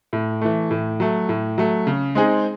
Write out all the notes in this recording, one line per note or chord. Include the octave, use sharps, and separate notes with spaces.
A2
E3 A3
A2
F#3 A3
A2
F#3 A3
C#3
G#3 C4 D#4 G#4